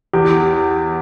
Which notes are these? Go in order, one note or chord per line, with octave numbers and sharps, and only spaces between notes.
E2 G4